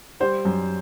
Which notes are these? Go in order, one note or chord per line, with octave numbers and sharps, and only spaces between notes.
G3 C5
F#2